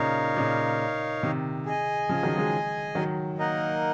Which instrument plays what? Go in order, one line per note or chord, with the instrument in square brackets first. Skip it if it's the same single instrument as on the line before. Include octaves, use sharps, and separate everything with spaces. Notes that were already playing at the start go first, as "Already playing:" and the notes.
Already playing: [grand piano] A#2 C#3 [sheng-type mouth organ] D#4 A#4 C#5 F5
[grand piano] A#2 C#3
C3 D#3
[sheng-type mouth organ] G#4 D#5 G#5
[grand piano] C#3 F3
D#3 F#3
F3 G#3
D#3 F#3
[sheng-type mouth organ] A#3 D#4 A#4 D#5 F#5